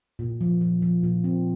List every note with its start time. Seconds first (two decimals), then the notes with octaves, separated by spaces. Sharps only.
0.19 A#2
0.41 F3
0.61 F3
0.82 F3
1.04 A#2
1.24 C4